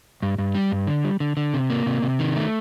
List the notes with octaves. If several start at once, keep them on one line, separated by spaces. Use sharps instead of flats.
G2
G2
G3
G2
D3
G3
D3
D3
C3
A#3
C3
C3
D#3
A3